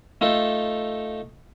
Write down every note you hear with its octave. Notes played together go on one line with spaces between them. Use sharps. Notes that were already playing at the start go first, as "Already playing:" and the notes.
A3 D#4 F4 A4